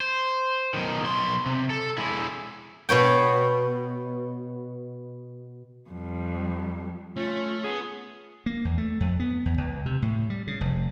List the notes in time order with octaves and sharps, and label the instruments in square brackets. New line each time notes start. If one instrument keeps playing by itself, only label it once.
[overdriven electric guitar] C5
B1 D#3
B1 C6
C3
A4
G#3 E4
[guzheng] B2 B3 C#5 G5
[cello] F2 G3
[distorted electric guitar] A3 [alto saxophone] C#4 [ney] F4
[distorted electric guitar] B3 [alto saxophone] G#4
[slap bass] A#3
E2
A3
F2
B3
E2
C#2
C3
A2
G3
C#3
F1